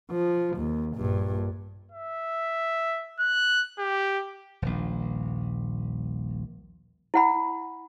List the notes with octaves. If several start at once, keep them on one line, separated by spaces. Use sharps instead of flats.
F3
D#2
A#1 G2
E5
F#6
G4
D#1 A#1
E4 F#5 B5